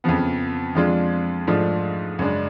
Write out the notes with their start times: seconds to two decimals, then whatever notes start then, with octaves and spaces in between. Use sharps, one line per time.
0.04 F2 C#3 F3 B3
0.75 F2 F3 G#3 D4 F4
1.47 G#2 F3 A3 D4 F4
2.19 F#2 C#3 G#3 D4